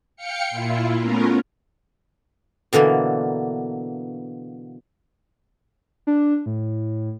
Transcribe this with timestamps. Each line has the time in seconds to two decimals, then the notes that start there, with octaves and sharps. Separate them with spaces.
0.16 F5 G5 C#7
0.50 A#2 E4 F4
0.99 A3 B3 C#4 F4 A#4
2.73 B2 D3 E3 A#3
6.07 D4
6.46 A2